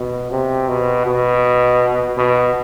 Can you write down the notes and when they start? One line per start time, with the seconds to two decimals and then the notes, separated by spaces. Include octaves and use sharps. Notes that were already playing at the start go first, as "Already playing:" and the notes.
Already playing: B2
0.31 C3
0.68 B2
1.06 B2
2.18 B2